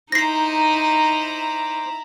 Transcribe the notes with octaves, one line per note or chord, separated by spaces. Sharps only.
D#4 E4 C5 A#5 D6 A#6 C7